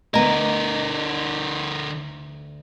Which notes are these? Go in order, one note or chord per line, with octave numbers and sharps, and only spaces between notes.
D2 D3 B3 A#4 D#5 A#5